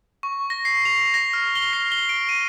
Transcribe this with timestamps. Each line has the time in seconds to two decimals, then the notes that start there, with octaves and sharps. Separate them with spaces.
0.23 C#6
0.50 A#6
0.65 C7
0.85 F7
1.14 A#6
1.33 F6
1.56 G7
1.73 C7
1.92 G7
2.09 D7
2.29 D#7